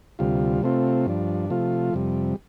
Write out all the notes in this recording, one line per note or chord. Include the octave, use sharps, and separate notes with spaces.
D2 C3 G3 F4
C3 A3 C4 F4
G2 F3 D4
C3 F3 A3 F4
F2 C3 G3